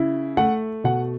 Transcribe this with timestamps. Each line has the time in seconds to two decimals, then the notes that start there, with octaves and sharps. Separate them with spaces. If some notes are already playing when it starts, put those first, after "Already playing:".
Already playing: C#3 E4
0.37 A3 F#5
0.84 B2 F#5